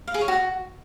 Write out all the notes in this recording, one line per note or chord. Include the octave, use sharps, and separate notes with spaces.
F5
G#4
C#5
F#4